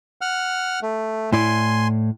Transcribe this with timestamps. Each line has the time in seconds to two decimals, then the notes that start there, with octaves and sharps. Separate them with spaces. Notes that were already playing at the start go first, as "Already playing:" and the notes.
0.21 F#5 F6
0.82 A3
1.32 A2 E4 D5 G#5 C6